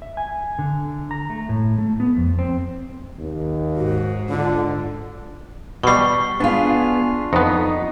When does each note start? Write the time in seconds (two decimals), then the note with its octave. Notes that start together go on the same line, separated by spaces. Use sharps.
0.02 E5
0.17 G#5
0.59 D3
1.11 A#5
1.30 A3
1.49 A2
1.78 A3
2.00 B3
2.17 F2
2.39 C4
3.19 D#2
3.76 G#2 F#4
4.29 D3 F4
5.83 B2 G3 C#6 C7
6.40 B3 D4 F4 G#4
7.33 F2 B3 D#4